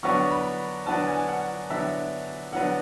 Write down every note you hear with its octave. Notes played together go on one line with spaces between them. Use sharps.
D3 F#3 B3 D4 C#6
B5
D3 F#3 B3 D4 A5
G#5
F#5
D3 F#3 B3 D4 E5
D3 F#3 B3 D4 F#5